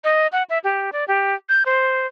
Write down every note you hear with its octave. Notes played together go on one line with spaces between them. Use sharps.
D#5
F#5
E5
G4
D5
G4
G6
C5